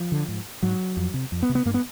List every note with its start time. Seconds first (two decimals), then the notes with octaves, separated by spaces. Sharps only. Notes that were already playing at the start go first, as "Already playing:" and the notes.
Already playing: F3
0.12 D3
0.28 G#2
0.63 G#2 F#3
0.97 F2
1.14 C3
1.32 F2
1.43 B3
1.49 C3
1.55 B3
1.65 G2 A#3
1.74 B3